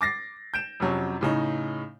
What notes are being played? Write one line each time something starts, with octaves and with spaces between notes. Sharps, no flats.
D6 A6 A#6 C7
G6 D7 E7
F2 C3 F#3 C#4
A2 C#3 D#4